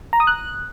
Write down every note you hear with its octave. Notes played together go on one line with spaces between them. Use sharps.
A#5
D#6
F#6